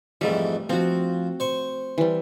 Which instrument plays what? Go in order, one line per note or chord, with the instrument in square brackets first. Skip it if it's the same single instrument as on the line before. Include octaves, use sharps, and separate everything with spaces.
[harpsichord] F2 G#2 E3 [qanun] G3 A3
[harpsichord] F3 [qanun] C4 F#4
[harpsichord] C5 C#6
[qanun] E3 G3